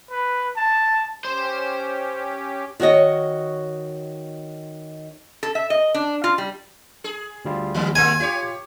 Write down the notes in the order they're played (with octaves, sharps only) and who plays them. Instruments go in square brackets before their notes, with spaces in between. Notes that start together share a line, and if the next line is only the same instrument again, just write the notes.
[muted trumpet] B4
A5
[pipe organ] C#4 G4 [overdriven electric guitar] C5 C6
[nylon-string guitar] D#3 F#4 C#5 D#5
[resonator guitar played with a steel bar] A4
E5
D#5
D4
F4
G3
[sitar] G#4
[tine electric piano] D2 G3 F4
[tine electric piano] D#2 [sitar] E3 G3 B3
[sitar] G#3 A#3 C4 [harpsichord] G#5
[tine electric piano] F4 [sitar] G4 C#5